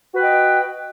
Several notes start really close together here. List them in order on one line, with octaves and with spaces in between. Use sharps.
F#4 B4 G5 D#5